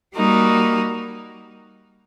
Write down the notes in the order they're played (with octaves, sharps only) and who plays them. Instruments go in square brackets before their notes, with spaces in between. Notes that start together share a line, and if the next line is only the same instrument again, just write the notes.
[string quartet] G3 A#3 D#4 F#4